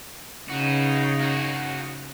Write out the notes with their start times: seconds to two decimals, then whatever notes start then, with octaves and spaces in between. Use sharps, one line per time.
0.50 C#3 D#4 F#4 B4
1.20 A#3 F#4